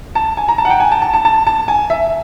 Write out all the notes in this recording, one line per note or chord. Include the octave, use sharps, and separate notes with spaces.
A5
G#5
A#5
A5
F#5
G5
G#5
A5
A5
A5
A5
A5
G#5
E5